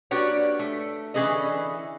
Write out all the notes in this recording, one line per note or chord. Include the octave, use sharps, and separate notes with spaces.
A#3 D4 F#4 G4 B4 C#5
A3
D3 E3 C#4 G#4 B4 D#5